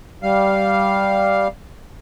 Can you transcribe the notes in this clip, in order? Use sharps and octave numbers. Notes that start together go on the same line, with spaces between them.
G3 F5